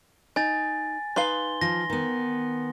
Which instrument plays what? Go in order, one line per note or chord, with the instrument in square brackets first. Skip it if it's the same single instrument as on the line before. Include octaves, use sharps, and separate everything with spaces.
[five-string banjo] D#4 [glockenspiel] G#5 A6
[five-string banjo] D#4 B4 F5 [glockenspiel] C6 G7
[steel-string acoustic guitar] F3 [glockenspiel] A#6
[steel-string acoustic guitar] D#3 B3